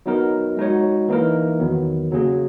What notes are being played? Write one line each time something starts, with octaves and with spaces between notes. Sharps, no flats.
F#3 B3 D#4 A#4
G#3 D#4 F#4 C#5
E3 A#3 D#4 A#4
E2 D#3 F#3 B3
C#3 F#3 A#3 C#4 G#4